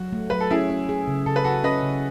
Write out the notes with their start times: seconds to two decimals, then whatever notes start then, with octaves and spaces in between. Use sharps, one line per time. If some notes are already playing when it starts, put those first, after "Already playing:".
Already playing: F#3 F#4
0.12 A3
0.30 F#3 B4
0.41 A4
0.51 C#4 E4 G#4
0.70 C#4
0.89 G#4
1.07 C#3
1.26 C#3 A4
1.36 B4
1.44 C#3 F#4 A4
1.64 C#4 B4 D#5
1.83 C#3